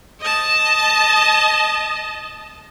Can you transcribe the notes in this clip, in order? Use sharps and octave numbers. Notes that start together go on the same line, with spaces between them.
D#5 A5